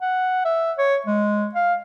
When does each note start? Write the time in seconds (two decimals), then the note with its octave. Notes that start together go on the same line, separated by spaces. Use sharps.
0.01 F#5
0.45 E5
0.78 C#5
1.06 G#3
1.55 F5